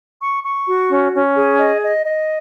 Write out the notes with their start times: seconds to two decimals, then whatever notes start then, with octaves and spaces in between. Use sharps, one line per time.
0.21 C#6
0.43 C#6
0.66 F#4
0.89 C#4
1.13 C#4
1.36 G#4
1.59 D#5
1.81 D#5
2.04 D#5